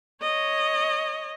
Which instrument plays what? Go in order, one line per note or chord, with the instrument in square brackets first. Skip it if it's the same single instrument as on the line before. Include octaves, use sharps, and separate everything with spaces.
[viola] C#5 D#5